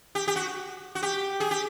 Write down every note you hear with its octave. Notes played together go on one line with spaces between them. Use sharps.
G4
G4
F#4
F#4
G4
G#4
G4